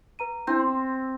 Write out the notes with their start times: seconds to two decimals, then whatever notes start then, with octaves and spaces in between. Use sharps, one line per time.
0.19 B4 A#5 D#7
0.47 C4 D4 E4 G6
0.60 C6